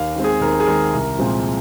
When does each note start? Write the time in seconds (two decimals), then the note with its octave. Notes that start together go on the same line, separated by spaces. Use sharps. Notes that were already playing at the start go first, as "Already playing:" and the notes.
Already playing: D#2 F5
0.15 D#3 G#3 C4
0.24 G#4
0.41 D#2 A#4
0.60 G#4
0.67 D#3 G#3 C4 A#4
0.94 C2
1.19 A#2 F3 G#3 C4